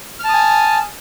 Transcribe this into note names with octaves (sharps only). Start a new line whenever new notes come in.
G#5 A5 D#6 F6